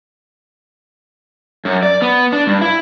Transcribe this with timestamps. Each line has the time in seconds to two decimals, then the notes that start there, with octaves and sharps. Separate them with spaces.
1.65 F#2
1.83 D5
2.02 B3
2.33 D4
2.47 G2
2.61 E4